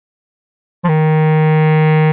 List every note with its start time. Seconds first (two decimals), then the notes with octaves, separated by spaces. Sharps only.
0.84 F3
0.89 D#3